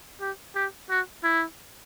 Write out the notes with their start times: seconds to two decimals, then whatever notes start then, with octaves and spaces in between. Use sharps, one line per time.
0.21 G4
0.55 G4
0.90 F#4
1.24 E4